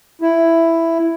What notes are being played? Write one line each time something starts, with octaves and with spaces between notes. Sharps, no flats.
E4